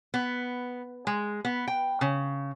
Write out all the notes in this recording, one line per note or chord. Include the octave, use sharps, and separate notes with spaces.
B3
G#3
B3
G5
C#3